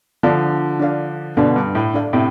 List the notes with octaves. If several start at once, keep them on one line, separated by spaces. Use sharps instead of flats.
D3 F3 D4 A4 D5 F5
D4 A4 D5 F5
B2 D3 D4 A4 D5 F5
G2
A2
D4 A4 D5 F5
A2 C3